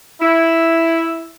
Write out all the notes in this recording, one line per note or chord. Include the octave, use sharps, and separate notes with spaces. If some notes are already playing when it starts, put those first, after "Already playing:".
E4